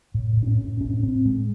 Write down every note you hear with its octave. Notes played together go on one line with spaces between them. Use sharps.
A2
A2
D4
C#4
A2
A2 C#4
C#4
A2 C4
A2 G#3